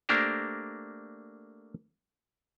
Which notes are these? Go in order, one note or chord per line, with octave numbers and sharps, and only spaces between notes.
A3 A#3 D4 G4 A#4 C5